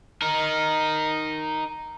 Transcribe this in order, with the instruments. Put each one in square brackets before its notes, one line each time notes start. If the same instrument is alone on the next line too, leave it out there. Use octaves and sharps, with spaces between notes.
[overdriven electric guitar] D#4 A#4